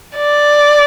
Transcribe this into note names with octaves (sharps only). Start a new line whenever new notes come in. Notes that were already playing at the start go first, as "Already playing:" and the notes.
D5